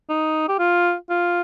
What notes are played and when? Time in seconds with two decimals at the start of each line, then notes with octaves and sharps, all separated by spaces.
0.09 D#4
0.49 G4
0.59 F4
1.10 F4